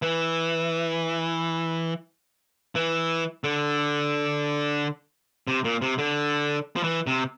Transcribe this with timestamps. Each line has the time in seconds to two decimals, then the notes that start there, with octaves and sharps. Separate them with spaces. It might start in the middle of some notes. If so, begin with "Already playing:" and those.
0.02 E3
2.75 E3
3.44 D3
5.48 C3
5.64 A#2
5.82 C3
5.98 D3
6.76 F3
6.84 E3
7.07 C3